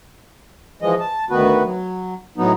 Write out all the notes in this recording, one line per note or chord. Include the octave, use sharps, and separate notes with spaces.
E3 F3 G#3 D#5
A5
D2 D#3 B3 F#4 B4
F#3
A2 F#3 B3 D#4